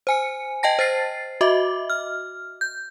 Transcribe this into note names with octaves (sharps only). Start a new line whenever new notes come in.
C5 G#5 C#7
D#5 G5 A5 A#6
C5 A6 C7
F#4 D#5 E5 D6
F6
G6